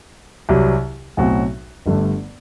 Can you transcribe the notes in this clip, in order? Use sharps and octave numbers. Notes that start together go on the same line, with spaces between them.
C2 C3 F#3
B1 A2 F#3 C4 F#4
G1 G2 D3 A3